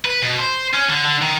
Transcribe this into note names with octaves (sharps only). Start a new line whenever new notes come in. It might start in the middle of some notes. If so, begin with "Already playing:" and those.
B4
B2
C5
C#4
D3
D3
D#3